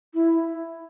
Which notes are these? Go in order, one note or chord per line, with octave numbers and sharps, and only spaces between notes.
E4